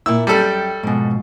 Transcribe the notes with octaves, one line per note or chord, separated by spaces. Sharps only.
A#2 E4 E6
F#2 G3 A4 G5
G#2 B2 F3 G#3